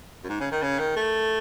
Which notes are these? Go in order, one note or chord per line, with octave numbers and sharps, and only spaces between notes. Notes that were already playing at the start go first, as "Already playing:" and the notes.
F#2
G#2
C#3
D#3
C#3
D#3
A3